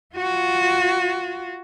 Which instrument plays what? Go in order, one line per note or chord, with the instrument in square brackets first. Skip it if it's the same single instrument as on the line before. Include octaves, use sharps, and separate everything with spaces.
[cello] F4 F#4